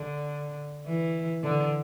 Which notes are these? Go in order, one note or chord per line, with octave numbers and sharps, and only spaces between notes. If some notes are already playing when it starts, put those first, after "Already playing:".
Already playing: D3
E3
D3